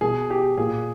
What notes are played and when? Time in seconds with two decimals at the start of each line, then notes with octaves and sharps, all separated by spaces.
0.01 B2 G#4
0.30 G4
0.58 A#2 G#4